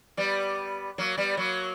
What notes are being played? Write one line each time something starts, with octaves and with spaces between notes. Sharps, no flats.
G3 B3
F#3 A#3
G3 B3
F#3 A#3